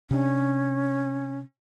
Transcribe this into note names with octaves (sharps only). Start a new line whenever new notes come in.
C3 C#4 D4